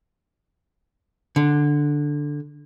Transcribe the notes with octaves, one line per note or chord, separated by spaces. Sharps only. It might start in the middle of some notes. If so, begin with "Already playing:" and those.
D3